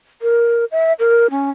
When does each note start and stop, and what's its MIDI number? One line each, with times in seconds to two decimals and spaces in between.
0.22 0.65 70
0.72 0.93 76
0.99 1.30 70
1.31 1.50 61